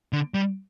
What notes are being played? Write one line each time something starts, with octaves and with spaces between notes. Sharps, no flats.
D3
G3